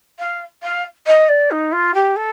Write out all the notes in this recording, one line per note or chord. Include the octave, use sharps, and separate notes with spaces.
F5
F5
D#5
D5
D#4
F4
G4
A4